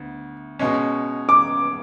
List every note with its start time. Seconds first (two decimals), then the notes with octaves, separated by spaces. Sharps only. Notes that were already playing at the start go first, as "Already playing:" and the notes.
Already playing: D2 B3
0.59 B2 G#3 C#4
1.29 D6